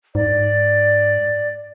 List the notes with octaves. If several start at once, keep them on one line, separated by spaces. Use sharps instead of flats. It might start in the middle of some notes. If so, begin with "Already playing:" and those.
G#2 D5